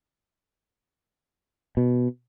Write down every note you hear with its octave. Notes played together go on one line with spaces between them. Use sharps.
B2